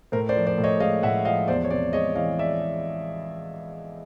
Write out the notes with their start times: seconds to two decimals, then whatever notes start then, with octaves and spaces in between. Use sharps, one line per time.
0.12 A2 A#4 C5
0.29 C5 D5
0.36 F3
0.47 C5 D5
0.58 A2
0.64 C#5 D#5
0.80 G#3 D#5 F5
1.03 A2 E5 F#5
1.25 F3 D#5 F5
1.48 E2 C5 D5
1.64 C#5
1.70 C3 C5 D5
1.93 G#3 C#5 D#5
2.15 E3 D#5 F5
2.39 D5 E5